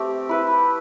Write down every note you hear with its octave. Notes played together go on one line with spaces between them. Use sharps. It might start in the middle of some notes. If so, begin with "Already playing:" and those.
Already playing: A3 C4 G4
E4 B4 E5